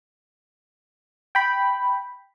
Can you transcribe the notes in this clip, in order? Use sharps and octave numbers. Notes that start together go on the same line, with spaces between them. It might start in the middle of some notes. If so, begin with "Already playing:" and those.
G5 B5